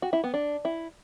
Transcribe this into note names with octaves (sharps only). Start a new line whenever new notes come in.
F#4
E4
B3
D4
E4